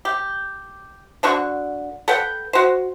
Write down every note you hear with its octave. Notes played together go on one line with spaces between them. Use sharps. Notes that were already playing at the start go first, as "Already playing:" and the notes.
G4
D3 D4 F#4 C#6
A4 B4 F#5 G5
F#4 C5